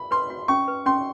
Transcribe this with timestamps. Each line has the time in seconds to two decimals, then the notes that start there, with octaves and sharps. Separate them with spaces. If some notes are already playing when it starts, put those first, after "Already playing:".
Already playing: B5
0.11 B4 C6
0.30 F#4
0.48 C#4 C#6
0.68 B4
0.86 C#4 C6